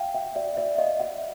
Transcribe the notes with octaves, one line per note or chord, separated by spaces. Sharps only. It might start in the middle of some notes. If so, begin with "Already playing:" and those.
Already playing: E5 F5 G5
E5 F#5
D5 E5
D5 E5
D#5 F5
E5 F#5